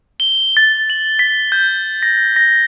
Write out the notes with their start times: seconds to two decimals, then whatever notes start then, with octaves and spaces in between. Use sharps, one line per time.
0.20 G7
0.57 A6
0.90 F#7
1.19 B6
1.52 G6
2.03 A#6
2.36 A#6